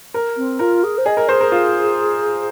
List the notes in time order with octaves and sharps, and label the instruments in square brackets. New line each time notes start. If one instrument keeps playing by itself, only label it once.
[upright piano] A#4
[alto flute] C4
[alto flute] F4 [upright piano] A#4
[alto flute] G#4
C5
[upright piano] G#4 [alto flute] D#5
[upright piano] A#4
[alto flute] G#4 [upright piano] C5
[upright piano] A#4
F4